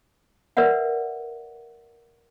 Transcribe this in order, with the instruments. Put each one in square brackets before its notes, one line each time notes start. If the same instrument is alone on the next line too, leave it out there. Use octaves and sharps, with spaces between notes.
[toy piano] A#4 B4 D5 E5 F#5